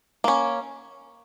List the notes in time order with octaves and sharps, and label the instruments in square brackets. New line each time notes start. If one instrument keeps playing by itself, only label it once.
[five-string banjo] A#3 C#4